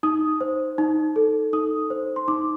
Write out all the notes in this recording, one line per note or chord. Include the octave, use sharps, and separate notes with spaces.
D#4 D#6
C5
D#4
A4
D#4 D#6
C5
C6
D#4 D6